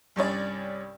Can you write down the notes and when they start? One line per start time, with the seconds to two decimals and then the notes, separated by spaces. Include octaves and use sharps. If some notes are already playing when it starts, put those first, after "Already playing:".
0.16 C2 G2 C#4 D5